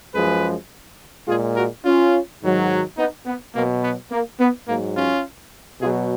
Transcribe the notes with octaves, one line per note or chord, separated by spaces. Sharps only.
F#2 F3 G#3 G#4 B4
A#2 G#3 F4 G#4
F#4 A#4
C#4 F4
G#2 D#3 F#3
B3 D#4
B3
B2 F#3 A#3
B3
A#3
B3
G#2 F#3 A#3
C#4 F4
B2 F#3 F4 G#4